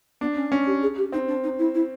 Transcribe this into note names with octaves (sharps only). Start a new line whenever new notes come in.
B3 D4
C#4
C#4 D4
G4
G#4
G4
C4 D#4
D4
D#4
E4
E4